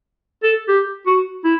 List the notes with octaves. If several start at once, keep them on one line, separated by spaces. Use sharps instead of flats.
A4
G4
F#4
E4